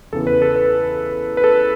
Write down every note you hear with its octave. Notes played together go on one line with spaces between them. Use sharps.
E2 C#3 E3 A4
B4
A4
B4
B4
A4